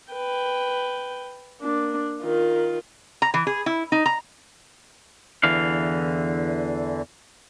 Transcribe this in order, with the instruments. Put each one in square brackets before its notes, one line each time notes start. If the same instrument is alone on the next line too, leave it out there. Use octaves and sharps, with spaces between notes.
[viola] B4 G5
A#3 D4
D#3 F4
[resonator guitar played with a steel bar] A#5
E3
G#4
E4
D#4
A#5
[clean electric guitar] E2 D3 E3 F5